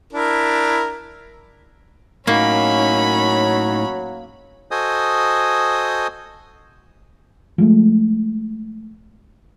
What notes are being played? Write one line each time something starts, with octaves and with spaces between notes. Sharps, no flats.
D4 E4 A#4
A2 F#3 A#3 C#4 D#4 B5
F#4 A4 C5 D#5 G#5 D#6
F3 G#3 A3